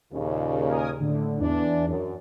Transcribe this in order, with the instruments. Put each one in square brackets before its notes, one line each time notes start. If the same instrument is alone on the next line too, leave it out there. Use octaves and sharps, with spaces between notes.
[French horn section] D#2 A#2 C#3
[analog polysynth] A#4 G#5 D#6
A2 D3
[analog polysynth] E2 [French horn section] E3 D4
[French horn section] F#2